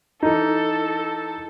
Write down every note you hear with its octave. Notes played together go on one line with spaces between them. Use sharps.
E3 D#4 A4